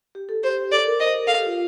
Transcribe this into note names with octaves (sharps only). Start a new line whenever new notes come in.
G4
A4
G4 C5
G4
A4 D5
A#4
C5 D#5
A#4
A4 F5
G4
F4